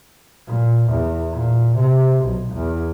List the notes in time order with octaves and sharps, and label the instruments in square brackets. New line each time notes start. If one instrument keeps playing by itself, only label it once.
[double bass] A#2
E2
A#2
C3
B1
E2